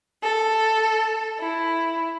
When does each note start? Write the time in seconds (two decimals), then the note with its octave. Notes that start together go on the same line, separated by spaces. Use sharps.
0.22 A4
1.39 E4